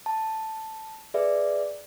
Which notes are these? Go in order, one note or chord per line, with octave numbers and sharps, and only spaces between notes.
A5
G#4 B4 D5 E5